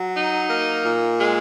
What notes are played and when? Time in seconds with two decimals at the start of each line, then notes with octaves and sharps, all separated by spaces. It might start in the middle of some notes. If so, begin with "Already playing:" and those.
Already playing: F#3
0.16 D#4
0.51 A#3
0.85 A#2
1.21 G#3